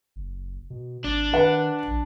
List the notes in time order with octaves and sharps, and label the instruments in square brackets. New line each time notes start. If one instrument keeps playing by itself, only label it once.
[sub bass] F#1
B2
[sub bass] G#1 [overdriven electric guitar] D4
[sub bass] D#3 [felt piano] B4 F#5
[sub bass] A#1